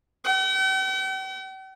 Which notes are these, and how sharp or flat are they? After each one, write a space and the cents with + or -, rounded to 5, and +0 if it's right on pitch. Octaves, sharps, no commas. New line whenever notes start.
G5 -45